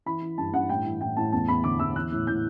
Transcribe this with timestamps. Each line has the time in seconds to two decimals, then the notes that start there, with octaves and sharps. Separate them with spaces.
0.06 E3 B5
0.22 E3
0.38 G2 A5
0.53 G2 F#5
0.69 A2 G5
0.85 E3
1.01 A2 G5
1.17 A2 A5
1.32 E2 A5
1.48 E2 B5
1.64 D3 D6
1.79 E2 E6
1.95 E3 F#6
2.12 A2
2.27 A2 G6